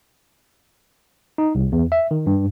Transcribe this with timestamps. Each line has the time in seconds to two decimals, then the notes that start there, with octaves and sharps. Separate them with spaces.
1.38 D#4
1.55 C2
1.72 E2
1.92 E5
2.11 D#3
2.27 G2